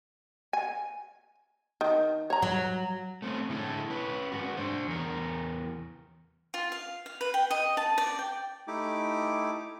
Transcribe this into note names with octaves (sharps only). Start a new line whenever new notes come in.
G#5
D#3
C#5 A#5
F#3
A3 C4 C#4
A2 D3 G#3 A#3 E4 A4
C#4 B4
G#2 F#4
D4 C5
E2 A#4
F4
F5
F5
B4
G5
D#5
A5
D5
G5
A3 D#4 E4 G4 D6